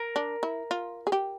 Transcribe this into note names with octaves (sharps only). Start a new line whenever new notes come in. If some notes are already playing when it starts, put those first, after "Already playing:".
Already playing: A#4
D4
E4
F4
G#4
G4